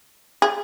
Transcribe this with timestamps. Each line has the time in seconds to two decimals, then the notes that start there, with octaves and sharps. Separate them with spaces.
0.42 G#4